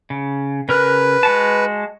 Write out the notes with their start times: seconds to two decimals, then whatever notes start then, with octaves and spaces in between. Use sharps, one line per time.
0.10 C#3
0.69 C#3 A#4 B4 F#6
1.23 G#3 F#4 A5